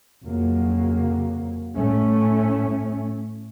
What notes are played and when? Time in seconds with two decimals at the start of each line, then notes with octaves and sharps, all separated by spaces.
0.24 F2 C#3 F#3 A#3
1.75 A2 A3 C#4